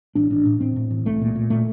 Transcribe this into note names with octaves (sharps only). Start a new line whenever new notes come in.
A1 D4
A1 D4
A2
A2 C4
A2
A1
C2 A3
A#2
A#2
A#2 A3